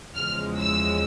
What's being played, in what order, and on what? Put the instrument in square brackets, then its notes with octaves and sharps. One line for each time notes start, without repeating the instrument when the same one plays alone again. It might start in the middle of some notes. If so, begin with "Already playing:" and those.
[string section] E2 C#3 F3 G#3 F6
E6